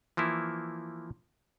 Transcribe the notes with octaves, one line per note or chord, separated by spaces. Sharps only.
E3 F3 A#3 E4